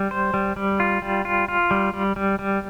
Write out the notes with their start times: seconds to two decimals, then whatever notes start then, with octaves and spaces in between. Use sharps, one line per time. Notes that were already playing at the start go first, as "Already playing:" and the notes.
Already playing: G3
0.11 C5
0.34 G3
0.56 G3
0.80 F4
1.02 G3
1.25 F4
1.48 F4
1.71 G3
1.93 G3
2.16 G3
2.39 G3